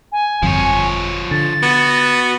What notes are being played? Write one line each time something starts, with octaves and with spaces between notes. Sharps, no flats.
G#5
G1 F2 F3 C#5
D3 A6
B3 F#4